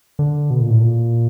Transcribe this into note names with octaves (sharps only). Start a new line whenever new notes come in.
D3
B2
A#2
A2
A#2